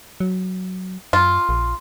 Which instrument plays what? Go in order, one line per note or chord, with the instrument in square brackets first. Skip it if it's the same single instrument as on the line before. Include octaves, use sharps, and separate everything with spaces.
[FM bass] F#3
[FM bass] F#2 [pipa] F4
[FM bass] A#1